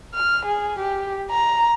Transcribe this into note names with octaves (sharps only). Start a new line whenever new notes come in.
F6
G#4
G4
A#5